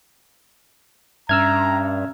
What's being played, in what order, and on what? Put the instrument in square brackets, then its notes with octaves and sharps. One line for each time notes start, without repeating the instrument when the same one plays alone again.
[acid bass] G2 [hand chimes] C#4 E5 [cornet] A#5 [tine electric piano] E6 F6 G#6